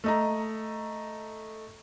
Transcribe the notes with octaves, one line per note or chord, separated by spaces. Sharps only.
A3 D#5 A#5